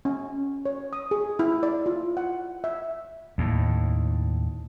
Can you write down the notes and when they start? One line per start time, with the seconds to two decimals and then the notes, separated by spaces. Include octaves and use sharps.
0.05 C#4
0.66 C#5
0.93 D#6
1.11 G#4
1.39 E4
1.63 D5
1.86 F4
2.17 F#5
2.64 E5
3.38 D#2 A2